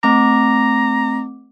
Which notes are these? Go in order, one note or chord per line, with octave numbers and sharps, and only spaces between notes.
A3 C4 A#5 D6